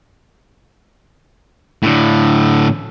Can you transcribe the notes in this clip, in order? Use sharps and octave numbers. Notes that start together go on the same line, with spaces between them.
A2 D3